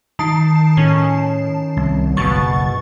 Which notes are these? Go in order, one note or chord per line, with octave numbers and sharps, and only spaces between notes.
D#3 A5 C7
A2 C#4
C2
F#1 B1 B2 C#6 A6